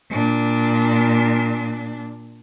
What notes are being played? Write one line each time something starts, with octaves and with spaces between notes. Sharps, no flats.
A#2 D4